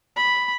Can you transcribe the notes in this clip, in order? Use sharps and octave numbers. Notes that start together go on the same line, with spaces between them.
B5